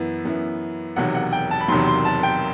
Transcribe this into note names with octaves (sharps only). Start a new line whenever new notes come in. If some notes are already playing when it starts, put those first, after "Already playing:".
Already playing: F#2 E3 B3 E4
F#2 E3 B3 E4
E1 E2 C3 D#3 F#3 F#5
F#5
G5
A5
B5
E1 E2 C3 D#3 F#3 C6
C6
A5
G5